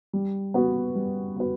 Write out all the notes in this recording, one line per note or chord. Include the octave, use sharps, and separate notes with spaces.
G3
B3 F#4 B4
G3
B3 F#4 B4